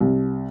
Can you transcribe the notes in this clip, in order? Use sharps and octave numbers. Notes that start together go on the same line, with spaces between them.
C2